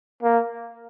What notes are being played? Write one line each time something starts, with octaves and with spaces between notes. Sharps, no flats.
A#3